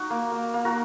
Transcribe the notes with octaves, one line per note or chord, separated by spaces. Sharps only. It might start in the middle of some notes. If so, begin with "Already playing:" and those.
Already playing: D#4 F#4
A#3
A#3
A#3
F#4 A#4